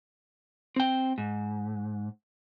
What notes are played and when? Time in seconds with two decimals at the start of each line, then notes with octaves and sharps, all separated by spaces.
0.76 C4 G5
1.18 G#2